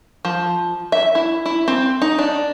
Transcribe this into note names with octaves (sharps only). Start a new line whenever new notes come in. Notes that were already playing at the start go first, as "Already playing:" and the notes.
F3
E5
E4
E4
C4
D#4
D4